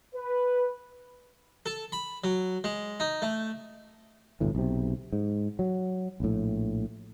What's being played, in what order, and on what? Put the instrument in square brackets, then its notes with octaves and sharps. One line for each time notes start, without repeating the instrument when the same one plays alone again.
[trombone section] B4
[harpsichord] A4
B5
F#3
G#3
D#4
A3
[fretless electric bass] G1 D2 A2 E3
B1 C3
G#2
F#3
A#1 A2